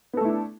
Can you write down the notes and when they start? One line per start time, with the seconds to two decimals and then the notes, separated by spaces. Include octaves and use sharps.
0.13 B3
0.17 A4
0.21 A3
0.25 E4
0.28 D4